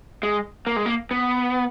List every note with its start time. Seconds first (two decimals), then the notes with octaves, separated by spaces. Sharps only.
0.23 G#3
0.67 A#3
0.76 G#3
0.86 A#3
1.11 B3